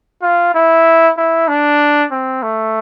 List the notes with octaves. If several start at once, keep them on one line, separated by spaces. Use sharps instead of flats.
F4
E4
E4
D4
C4
A3